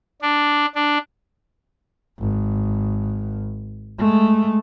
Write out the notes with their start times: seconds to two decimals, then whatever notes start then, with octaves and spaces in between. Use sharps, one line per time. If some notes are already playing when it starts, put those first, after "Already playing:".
0.22 D4
0.75 D4
2.19 G#1
3.98 G#3 A3